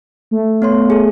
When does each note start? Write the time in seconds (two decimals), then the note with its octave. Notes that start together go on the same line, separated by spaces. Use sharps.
0.31 A3
0.62 B3 C#5 C6
0.90 G#4 A4